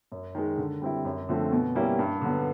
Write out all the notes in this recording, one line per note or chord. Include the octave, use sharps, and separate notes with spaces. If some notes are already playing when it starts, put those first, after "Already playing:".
F#2
D#3 G#3
D3
G3 C4 E4
F#2
D3 F3 A3 C4
B2
G3 A#3 C#4 E4
G2
D3 F#3 B3